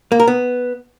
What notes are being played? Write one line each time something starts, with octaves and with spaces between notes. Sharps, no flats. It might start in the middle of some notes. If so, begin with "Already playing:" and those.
A#3
A#4
B3